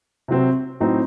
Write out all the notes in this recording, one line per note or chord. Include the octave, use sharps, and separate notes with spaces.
C3 F#3 C4
A2 F#3 C4 D#4